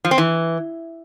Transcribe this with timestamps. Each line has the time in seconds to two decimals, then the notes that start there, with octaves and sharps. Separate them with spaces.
0.05 F3
0.11 C4
0.18 E3